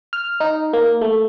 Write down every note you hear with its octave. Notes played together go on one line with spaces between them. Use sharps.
F6
D#4
A#3
A3